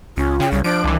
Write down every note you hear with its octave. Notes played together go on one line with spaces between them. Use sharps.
C#2 C#4 F4
C#3 G5
C2 G3 C#5
F3 D4 C5 D7
C2 D#3 E3